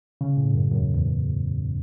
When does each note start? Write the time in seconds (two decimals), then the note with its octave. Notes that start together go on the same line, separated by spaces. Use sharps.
0.21 C#3
0.37 A2
0.54 F#2
0.71 F#2
0.78 E2
0.94 E2